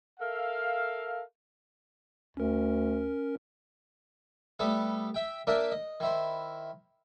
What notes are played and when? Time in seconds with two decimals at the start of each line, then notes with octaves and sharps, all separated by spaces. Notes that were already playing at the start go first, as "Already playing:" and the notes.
0.20 A4 A#4 E5 F5
2.37 D2 C#4 A#4
4.59 G3 A3 B3 A4
5.14 E5 G5
5.47 A#3 D4 A#4 D5 E5
5.72 D#5
6.00 D#3 E4 C5